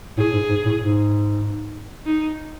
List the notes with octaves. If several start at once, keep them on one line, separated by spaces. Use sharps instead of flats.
A2 G#4
G#2
G#2
A2
G#2
D#4